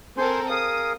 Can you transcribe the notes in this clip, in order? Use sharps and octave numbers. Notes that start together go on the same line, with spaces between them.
C4 A4 A#4 C5 G#5 C6
G#4 A#4 F5 D#6